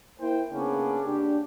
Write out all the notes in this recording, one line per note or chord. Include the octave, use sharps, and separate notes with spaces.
A#3 E4 C5 G5
C#3 A#3 B3 C#4 D4
D4 G4